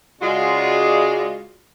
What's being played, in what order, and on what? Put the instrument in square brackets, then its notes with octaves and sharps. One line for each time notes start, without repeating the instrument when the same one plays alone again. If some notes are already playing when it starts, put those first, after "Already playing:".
[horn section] C#3 G#3 D5 [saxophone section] F4 F#4